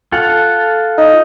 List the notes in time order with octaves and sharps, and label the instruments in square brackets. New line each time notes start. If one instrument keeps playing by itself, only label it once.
[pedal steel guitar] F4 A4 F#5
[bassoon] D#4